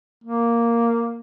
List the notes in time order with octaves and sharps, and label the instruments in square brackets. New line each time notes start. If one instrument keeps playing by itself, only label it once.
[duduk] A#3